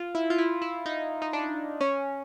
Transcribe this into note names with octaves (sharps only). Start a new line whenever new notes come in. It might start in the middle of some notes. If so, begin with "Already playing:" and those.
Already playing: F4
E4
F4
E4
E4
D#4
D#4
D4
C#4